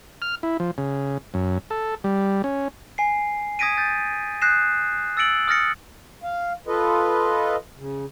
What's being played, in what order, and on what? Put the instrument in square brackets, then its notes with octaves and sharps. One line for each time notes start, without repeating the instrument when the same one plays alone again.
[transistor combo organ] F6
E4
F3
C#3
F#2
A4
G3
C#4
[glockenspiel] G#5 C7
D#6 G#6 A#6 B6 D7 D#7
G6 A6
D#6 F#6 G6 A#6 C7 E7
E6 A6 A#6 C#7 D7 F#7
D#6 F6 A6 A#6 C#7
[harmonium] F5
F4 A4 B4 D#5
C#3